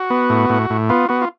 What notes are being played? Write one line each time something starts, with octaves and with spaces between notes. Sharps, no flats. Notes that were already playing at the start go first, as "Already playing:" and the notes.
Already playing: F#4
B3
A2
A2
A2
B3 F4
B3 F#4
F4